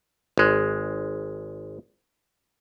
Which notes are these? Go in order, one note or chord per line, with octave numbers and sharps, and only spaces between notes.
G#1 G#3